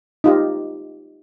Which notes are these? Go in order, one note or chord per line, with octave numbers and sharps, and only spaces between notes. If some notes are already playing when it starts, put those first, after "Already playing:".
D#4 F4 G4